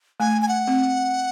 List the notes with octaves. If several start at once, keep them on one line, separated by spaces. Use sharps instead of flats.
A3 G#5
G#5
F#5
C4